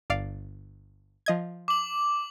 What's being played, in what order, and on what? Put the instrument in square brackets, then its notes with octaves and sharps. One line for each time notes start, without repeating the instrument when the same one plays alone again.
[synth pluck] G1 D5 F5
F3 D#5 G#6
[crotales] D6 F#7